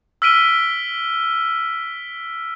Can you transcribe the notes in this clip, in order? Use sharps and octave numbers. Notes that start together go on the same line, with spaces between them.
E6 F6 B6 D7 D#7 G7